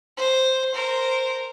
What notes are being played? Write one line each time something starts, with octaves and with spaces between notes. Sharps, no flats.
C5
A#4 C5